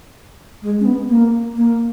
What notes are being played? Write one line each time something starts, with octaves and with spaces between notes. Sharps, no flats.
G#3
C#4
B3
A#3
A#3